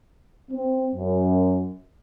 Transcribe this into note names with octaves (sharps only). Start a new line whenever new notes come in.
C4
F#2